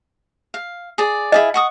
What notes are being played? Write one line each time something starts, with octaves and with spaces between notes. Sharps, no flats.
F5
G#4 D5
E4 G#4 D#5 F5
F#5 C#6 D#6